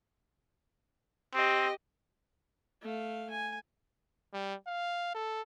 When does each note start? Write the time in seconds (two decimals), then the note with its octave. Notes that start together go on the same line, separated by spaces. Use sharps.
1.34 C4 G4 D#5
2.82 A3 F5
3.30 G#5
4.34 G3
4.67 F5
5.15 A4